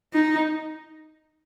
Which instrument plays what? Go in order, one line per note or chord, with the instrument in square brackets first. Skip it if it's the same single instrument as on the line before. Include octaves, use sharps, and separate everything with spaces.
[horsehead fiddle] D#4